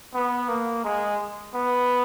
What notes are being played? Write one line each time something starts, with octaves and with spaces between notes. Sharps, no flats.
B3
A#3
G#3
B3